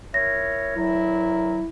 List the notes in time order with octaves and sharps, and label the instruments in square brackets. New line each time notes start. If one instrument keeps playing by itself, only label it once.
[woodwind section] E4 A#4 C#5 [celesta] A#6
[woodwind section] D2 D#3 F#3 [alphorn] E4